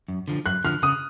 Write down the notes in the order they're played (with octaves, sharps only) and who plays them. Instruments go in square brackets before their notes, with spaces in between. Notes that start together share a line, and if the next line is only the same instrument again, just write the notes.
[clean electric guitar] F#2
D3 F3
[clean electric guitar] F#2 [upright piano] F#6
[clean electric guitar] D3 F3 [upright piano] F6
[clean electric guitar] C#3 [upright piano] D#6